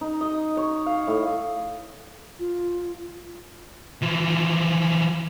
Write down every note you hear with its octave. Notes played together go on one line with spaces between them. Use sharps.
D#4
D#5
C#5
F5
A2
F4
E3 F3